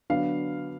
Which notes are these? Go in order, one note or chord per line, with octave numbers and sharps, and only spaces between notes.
D3 F#3 B3 D4 F5